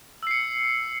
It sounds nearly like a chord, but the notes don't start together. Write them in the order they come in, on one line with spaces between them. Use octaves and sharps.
E6 C7 C#7